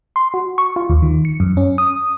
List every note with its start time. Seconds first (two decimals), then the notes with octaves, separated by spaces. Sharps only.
0.16 C6
0.34 F#4
0.58 C#6
0.76 F4
0.89 D#2
1.02 D#3
1.25 C#7
1.40 F#2
1.57 C#4
1.78 D#6